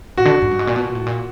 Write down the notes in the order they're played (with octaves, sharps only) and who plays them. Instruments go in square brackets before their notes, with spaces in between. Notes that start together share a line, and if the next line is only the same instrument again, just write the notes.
[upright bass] A2 [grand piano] F#4
[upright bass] D3
G#2
G2
G#2
A#2
B2
A#2
A2
A#2